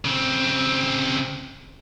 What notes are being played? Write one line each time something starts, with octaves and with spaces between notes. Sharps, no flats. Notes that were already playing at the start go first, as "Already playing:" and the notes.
C#3 C4